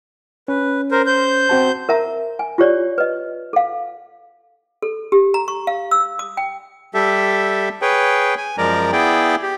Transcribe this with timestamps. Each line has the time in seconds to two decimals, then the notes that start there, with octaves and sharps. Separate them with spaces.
0.48 C#4 B4
0.91 A#4 C5
1.07 C5 G6
1.49 C4 F#4 A5
1.89 A#4 E5 A5 A#5
2.39 G#5
2.58 F4 G4 C#5 D5
2.98 B4 D#5
3.53 A4 F5
4.82 A4
5.12 G4
5.34 A#5
5.48 C#6
5.67 F5
5.91 E6
6.19 D#6
6.37 G5
6.94 G3 G4 A4 E5
7.82 G#4 B4 C#5 G5
8.38 G#5
8.58 F#2 F3 G#3 A#4 D5 A#5
8.92 B3 E4 G#4 D5 G5
9.42 G4